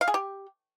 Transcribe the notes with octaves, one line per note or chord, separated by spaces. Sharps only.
F5
G#4
G4